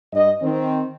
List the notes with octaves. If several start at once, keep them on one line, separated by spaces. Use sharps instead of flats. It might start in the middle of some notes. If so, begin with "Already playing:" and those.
G2 D#5
D#3 C4